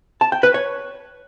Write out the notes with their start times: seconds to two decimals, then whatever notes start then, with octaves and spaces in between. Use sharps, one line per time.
0.21 A5
0.32 G5
0.43 B4
0.54 C#5